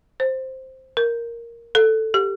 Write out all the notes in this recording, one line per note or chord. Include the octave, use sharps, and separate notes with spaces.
C5
A#4
A4
G4